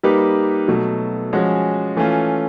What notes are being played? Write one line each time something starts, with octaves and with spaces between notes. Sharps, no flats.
G3 A#3 D#4 G4 B4
B2 F#3 A3
F3 G#3 C#4 F#4
E3 A3 C#4 F4